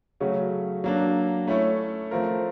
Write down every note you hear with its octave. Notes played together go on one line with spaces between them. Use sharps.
C#3 F#3 A3 C#4 F#4
F#3 A#3 D4
A3 C#4 E4 A4 C#5
F3 A3 C4 F4 A#4